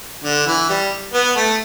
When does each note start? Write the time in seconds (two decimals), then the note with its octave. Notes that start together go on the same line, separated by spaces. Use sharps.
0.24 D3
0.47 E3
0.69 G3
1.13 B3
1.36 A3